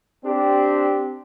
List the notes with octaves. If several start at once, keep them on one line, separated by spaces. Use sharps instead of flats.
C4 D4 G4